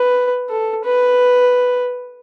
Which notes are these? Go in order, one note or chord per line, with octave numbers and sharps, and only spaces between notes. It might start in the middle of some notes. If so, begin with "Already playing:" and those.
Already playing: B4
A4
B4